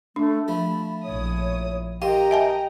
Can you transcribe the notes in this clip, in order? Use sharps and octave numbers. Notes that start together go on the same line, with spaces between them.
A3 D4
F3 A3 B5
A#1 E4 C#5 D#6
D#3 G4 D#5 F5 G5 A#5 C6
E5 G#5 A5